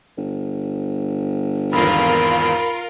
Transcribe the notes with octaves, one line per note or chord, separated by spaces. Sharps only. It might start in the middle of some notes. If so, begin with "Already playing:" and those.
G1
G#1 E2 F4 A#4 B5